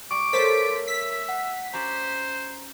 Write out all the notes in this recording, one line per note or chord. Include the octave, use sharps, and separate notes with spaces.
G3 C#6 D6
A3 A#4 C5 C#5 A6 B6
E5 B6
F#5
C#4 F#4 C5 D5 A#5